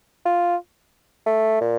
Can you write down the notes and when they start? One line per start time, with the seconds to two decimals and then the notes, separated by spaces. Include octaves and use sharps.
0.25 F4
1.26 A3
1.61 A#2